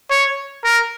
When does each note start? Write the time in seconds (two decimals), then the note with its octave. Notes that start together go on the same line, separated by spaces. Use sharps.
0.10 C#5
0.64 A#4